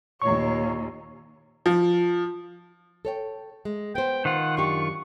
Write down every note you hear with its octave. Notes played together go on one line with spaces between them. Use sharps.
D#2 A#2 C#5 C#6
F3
A4 C#5 G5
G#3
B3 C5 G5
D#3 F4 F#5
F#2 D4 G4 C#6